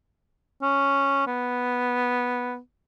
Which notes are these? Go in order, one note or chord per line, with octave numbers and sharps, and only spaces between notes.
C#4
B3